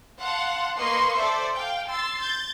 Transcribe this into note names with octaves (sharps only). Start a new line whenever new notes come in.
F5 F#5 A5 C6
A#3 B4 D#5 C6 C#6 C7
A4 C5 D5 E5
F5 G5
C6 E6 A6 C7
G6 A6